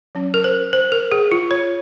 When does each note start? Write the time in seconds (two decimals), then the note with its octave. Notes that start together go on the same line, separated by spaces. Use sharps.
0.15 F#3 C#4
0.34 A#4
0.44 C5
0.73 C5
0.92 A#4
1.12 G#4
1.32 F4
1.51 C#5